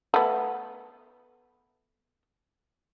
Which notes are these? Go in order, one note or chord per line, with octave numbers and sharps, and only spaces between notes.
A3 B3